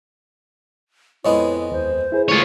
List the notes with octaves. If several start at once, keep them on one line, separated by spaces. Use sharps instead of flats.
F2 G#3 B3 E4 C#5 D#5
D#2 C5
E4 G#4 B4
A3 F4 C#5